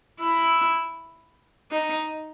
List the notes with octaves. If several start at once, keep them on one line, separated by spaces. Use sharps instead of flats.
E4
D#4